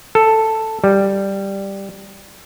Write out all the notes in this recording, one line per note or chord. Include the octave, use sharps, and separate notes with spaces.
A4
G3